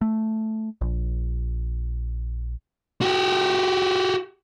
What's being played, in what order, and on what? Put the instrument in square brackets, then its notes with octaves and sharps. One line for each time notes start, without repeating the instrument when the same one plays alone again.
[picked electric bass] A3
A#1
[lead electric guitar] F#4 G4